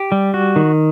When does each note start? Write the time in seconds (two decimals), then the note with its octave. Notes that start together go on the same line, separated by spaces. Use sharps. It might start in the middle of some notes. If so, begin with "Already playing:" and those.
Already playing: G4
0.12 G3
0.34 F#4
0.56 D#3